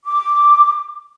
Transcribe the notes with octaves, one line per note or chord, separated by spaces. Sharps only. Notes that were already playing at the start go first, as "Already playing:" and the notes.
D6